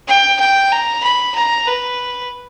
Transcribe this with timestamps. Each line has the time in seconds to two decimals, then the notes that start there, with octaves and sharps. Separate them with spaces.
0.08 G5
0.41 G5
0.72 A#5
1.04 B5
1.36 A#5
1.67 B4